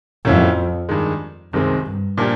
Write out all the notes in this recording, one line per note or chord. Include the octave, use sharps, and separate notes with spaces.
F2 A2 F#3 A#3 C#4 E4
G2 D#3 G#3
C2 F#2 C3 D#3 G#3 C4
G2
A#2 F3 A#3 D4 G4